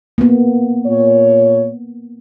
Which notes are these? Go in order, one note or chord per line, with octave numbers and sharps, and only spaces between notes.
A#3 B3
A#2 C#5